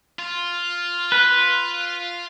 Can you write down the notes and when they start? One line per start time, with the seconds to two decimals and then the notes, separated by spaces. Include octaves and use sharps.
0.19 F4
1.12 B4